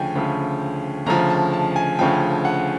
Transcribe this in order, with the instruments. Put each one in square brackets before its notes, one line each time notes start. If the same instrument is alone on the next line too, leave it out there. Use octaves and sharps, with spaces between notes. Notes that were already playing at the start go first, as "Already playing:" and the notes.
Already playing: [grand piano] D2 C#3 F3 G5 G#5
D2 C#3 F3
D2 C#3 F3 A#5
A5
A5
G#5
D2 C#3 F3 G5
F#5